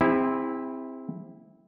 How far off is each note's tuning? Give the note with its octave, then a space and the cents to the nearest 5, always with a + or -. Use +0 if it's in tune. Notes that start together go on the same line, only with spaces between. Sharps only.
C4 +0 E4 -10 G#4 -40